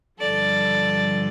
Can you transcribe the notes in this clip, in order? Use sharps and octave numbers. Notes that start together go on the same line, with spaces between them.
G2 D3 F3 A4 D5